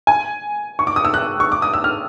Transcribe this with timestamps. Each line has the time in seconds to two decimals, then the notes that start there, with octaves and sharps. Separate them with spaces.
0.07 G#5
0.79 C#6
0.87 D6
0.96 D#6
1.05 E6
1.14 F#6
1.40 C#6
1.52 D6
1.62 D#6
1.73 E6
1.84 F6